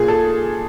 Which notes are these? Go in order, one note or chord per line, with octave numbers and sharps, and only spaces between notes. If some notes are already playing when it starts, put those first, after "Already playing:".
Already playing: A#2 G#4
A4